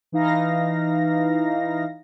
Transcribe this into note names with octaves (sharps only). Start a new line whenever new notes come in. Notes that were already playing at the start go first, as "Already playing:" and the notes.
E3 D#4 F5 A#6